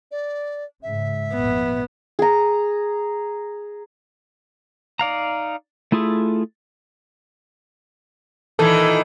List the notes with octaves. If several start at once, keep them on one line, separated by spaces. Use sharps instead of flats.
D5
G#2 C#3 E5
G#1 F2 A#2 B3
G#4 A#5
D#4 D5 F5 A#5
A3 E4 F4 G#4 A4
A#2 D#3 E3 A4